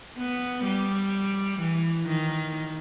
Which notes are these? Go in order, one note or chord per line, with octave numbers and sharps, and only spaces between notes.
B3
G3
E3
D#3